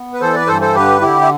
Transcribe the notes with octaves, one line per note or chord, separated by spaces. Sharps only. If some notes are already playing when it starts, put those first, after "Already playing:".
Already playing: B3
B4
E3 A4 C5
B4 D5
G2 A4 C5
A4 C5
D3 G4 B4
D3 E4 G4
E4